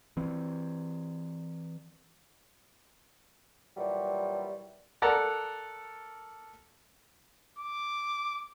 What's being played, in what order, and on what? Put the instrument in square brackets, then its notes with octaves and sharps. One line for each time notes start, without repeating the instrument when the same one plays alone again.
[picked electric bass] E3 C4
[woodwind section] A#2 E3 F#3 G3
[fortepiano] A4 A#4 D5 F#5 A#5
[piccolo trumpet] D6